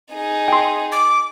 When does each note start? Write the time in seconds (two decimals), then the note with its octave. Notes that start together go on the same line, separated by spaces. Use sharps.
0.13 D#4 G#4
0.48 G5 C6
0.92 D6